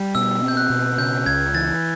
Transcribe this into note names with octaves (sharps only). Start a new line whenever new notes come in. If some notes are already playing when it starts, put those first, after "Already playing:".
Already playing: G3
B2 E6
C4
G6
F#6
B2
C#3 G6
C#2 G#6
E3 A6